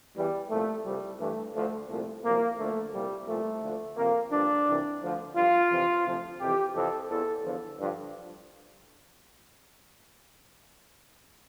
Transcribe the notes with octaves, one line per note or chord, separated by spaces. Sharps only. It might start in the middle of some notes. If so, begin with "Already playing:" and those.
E2 E3 G3
C2 A#2 F3 A3
C2 C3 F3 G3
G2 E3 A3
D2 D3 F3 A3
C2 A#2 F3 A3
C2 A#2 F3 A#3
D2 D3 F3 A3
C2 A#2 F3 G3
C2 A#2 F3 A3
D2 D3 F3
F2 C3 F3 A#3
G2 D3 F3 D4
C2 C3 E3
D2 D3 F3
G2 F3 F4
F2 C3 E3
D2 C3 F3
F2 C3 E3 G4
F2 C3 E3 A4
E2 E3 A4
E2 D3 F3
G2 D3 F3